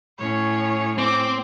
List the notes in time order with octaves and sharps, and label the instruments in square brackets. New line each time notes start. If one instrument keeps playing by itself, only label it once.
[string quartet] A2 C#4 [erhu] C#5
[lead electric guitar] C4 [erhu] D6